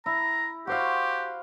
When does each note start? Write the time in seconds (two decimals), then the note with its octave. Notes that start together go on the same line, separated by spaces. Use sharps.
0.06 E4 A#5
0.67 F#4 G4 C5 F5